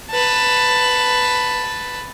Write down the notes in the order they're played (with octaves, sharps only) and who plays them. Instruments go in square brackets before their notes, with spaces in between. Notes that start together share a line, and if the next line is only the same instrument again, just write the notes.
[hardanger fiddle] B4 A5